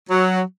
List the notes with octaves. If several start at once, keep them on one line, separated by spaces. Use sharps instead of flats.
F#3